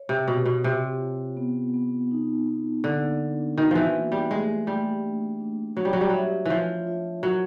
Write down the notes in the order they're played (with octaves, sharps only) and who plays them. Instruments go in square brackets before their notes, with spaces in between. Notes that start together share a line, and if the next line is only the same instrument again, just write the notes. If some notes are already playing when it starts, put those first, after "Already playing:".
Already playing: [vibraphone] C#5
[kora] C3
[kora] B2 [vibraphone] C#5
[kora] B2
[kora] C3 [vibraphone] F4
[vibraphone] F4
B3
B3
D#4
B3
[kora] D3 [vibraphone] A#3
[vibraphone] D4
[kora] D#3 [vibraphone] F#4
[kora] E3 F3
[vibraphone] A#3
[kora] G3
[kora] G#3 [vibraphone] A3
[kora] G3 [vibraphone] A3
[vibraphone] D4
D4
[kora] F#3 [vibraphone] C#5
[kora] G3
F#3
G3
[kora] F#3 [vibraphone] E5
[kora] E3 F3 [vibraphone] F4
[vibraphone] F4
[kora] F#3 [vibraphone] A#4